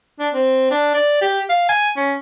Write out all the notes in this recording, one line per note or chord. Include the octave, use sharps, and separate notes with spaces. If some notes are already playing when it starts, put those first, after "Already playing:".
D4
C4
D4
D5
G4
F5
G#5
C#4